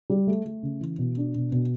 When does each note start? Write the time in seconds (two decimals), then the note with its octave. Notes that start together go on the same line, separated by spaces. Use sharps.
0.10 G3
0.27 A3
0.45 A3
0.63 C#3
0.81 E3
0.99 B2
1.17 D4
1.35 B2
1.52 B2